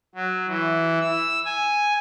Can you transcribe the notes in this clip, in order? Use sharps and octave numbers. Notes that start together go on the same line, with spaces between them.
F#3
E3
E6
G#5